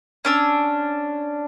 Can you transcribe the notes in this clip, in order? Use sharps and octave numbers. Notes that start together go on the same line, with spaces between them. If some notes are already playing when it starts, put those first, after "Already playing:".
C#4 D4 E6